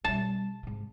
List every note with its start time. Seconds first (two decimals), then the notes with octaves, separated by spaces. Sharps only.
0.05 B2 G3 A5
0.63 G#2 C3